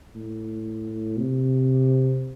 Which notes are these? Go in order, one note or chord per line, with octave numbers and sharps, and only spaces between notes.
A2
C3